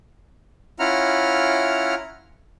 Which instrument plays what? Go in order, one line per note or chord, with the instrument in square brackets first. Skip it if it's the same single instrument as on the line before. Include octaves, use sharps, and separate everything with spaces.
[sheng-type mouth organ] C#4 E4 F4 F#5 A#5 F6